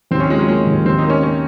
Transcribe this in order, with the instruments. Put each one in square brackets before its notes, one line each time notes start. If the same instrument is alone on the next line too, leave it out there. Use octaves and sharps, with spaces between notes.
[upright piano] D#2 [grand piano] C4
[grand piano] C#4
[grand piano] G#3 [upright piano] F4
[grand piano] F#3
[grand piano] G#3 [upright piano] A#3
[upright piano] D#2
[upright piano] D#2 [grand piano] C4
[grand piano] D#4
[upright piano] A#3
[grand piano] C#4
[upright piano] A#3 [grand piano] C#4